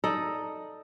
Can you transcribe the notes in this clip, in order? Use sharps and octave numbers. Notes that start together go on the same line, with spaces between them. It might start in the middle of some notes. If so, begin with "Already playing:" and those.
D#4 A4 D5 D#5